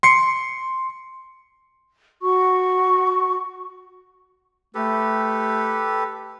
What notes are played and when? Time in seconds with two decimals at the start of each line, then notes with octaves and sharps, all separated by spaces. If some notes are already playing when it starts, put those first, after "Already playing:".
0.03 C6 C7 C#7
2.22 F#4 C#6
4.75 A3 G4 A4 B4